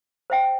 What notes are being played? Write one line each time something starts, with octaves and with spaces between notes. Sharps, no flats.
C5 E5 G5